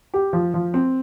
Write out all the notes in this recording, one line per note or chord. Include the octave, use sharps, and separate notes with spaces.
G4
F3
F3
C4